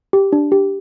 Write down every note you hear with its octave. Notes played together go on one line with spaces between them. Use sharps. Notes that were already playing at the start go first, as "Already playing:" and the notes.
G4
D4
G4